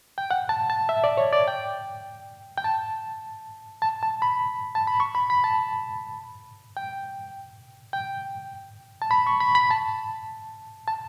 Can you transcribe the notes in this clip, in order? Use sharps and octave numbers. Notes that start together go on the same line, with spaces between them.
G5
F#5
A5
A5
E5
D5
C#5
D5
G5
G5
A5
A5
A5
B5
A5
B5
C#6
B5
B5
A5
G5
G5
A5
B5
C#6
B5
B5
A5
A5